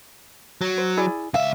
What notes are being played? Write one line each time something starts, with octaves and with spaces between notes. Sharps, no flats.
F#3
C5
E4 G#4 D5
C#2 E5 F5